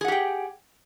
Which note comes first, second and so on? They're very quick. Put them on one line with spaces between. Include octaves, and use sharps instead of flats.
G#4 F#5 G4 G5